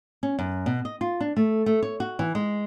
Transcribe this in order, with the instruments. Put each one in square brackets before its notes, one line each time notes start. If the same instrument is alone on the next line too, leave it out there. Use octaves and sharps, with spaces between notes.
[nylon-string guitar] C#4
F#2
B2
D#5
F4
D4
A3
A3
C#5
F#4
E3
G#3